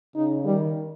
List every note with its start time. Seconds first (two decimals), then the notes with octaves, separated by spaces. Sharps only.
0.16 C#3 D#4
0.45 D#3 G3